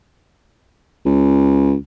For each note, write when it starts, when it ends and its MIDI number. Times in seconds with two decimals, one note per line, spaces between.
1.05 1.74 37